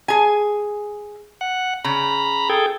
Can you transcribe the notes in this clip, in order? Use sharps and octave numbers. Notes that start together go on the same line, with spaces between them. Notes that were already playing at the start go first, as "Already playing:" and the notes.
G#4 G#5
F#5
C#3 A#5 B5
G#4 A4 G5